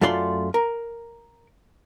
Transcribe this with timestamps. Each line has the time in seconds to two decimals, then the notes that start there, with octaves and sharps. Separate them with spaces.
0.01 F#2 A3 F4 D5 C6
0.54 A#4